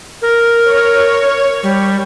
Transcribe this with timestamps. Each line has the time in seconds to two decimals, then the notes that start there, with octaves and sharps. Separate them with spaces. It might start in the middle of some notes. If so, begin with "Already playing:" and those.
0.22 A#4
0.67 C#5
1.63 G3